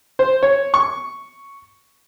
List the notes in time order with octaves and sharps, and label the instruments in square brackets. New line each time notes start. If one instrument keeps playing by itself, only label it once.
[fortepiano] C5
C#5
C#6